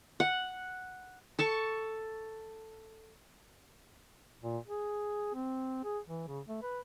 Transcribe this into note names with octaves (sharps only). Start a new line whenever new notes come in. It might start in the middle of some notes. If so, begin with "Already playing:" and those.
F#5
A4 A5 C#6
A#2
G#4
C4
G#4
E3
C#3
A3
B4